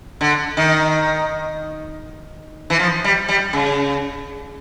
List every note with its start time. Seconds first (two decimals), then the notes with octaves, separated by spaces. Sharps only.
0.21 D3
0.57 D#3
2.70 E3
2.79 F3
3.04 G3
3.28 G3
3.53 C#3